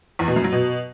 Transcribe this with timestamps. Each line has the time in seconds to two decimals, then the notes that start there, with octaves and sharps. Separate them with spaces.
0.19 E2
0.28 B2
0.36 F#2
0.44 F#3
0.52 B2